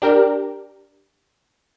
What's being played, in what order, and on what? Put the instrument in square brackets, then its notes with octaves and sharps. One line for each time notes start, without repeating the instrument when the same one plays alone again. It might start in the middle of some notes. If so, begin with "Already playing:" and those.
[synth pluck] D4 G4 A#4